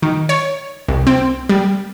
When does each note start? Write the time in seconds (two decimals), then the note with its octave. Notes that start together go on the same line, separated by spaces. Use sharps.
0.02 D#3
0.29 C#5
0.88 C2
1.07 C4
1.49 G3